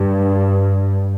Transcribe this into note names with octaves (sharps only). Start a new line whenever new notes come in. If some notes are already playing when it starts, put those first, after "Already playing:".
Already playing: G2